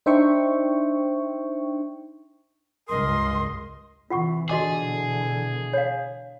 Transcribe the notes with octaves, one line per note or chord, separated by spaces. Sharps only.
D4 D#4 C5 E5 G5 C#6
C#2 G2 G#4 A#4 D#5 C6
C3 E3 F4 F#5 C#6
B2 D3 E3 F#4 G#4 D#5 D6
C#5 F5